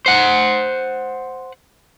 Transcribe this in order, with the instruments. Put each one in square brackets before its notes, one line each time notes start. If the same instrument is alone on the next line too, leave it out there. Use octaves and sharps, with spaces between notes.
[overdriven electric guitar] C5 F#5